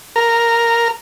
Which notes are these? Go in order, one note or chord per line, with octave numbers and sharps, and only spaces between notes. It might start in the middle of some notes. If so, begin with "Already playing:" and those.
A#4